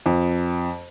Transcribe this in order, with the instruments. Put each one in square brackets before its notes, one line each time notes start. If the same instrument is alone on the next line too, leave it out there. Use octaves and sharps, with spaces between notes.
[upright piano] F2